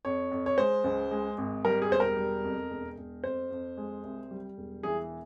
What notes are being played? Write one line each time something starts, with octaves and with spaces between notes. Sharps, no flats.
F2 C#5
F2
C#5
G#3 C5
C#2
G#3
G#1
G3 A#4
G#4
E1 C5
A#4
G3
F2
E1
E1
F2 C5
F2
G#3
C2
G3
E1
E3 G#4